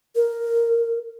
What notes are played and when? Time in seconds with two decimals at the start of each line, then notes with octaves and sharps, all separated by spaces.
0.16 A#4